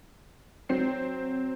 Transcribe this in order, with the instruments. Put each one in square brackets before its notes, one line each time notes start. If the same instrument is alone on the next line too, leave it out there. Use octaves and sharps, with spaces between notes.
[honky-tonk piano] F#3 C4 C7